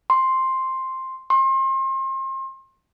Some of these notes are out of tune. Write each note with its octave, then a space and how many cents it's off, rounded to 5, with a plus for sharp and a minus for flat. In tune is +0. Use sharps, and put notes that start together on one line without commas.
C6 +5
C6 +35